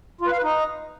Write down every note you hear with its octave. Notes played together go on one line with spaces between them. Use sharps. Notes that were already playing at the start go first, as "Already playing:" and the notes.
F4
B4
F5
B4
D#4